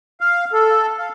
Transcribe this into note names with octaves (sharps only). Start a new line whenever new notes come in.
F5
A4
F5